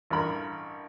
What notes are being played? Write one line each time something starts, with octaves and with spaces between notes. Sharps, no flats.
A1 G2 A#4 B5